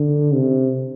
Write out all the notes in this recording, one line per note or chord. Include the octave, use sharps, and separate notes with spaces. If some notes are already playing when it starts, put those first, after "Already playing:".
Already playing: D3
C3